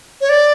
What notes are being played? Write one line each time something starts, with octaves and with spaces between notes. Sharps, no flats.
C#5
D5